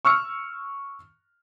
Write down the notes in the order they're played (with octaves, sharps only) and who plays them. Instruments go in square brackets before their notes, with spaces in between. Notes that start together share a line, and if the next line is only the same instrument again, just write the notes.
[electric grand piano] C#6 E6 F6 C#7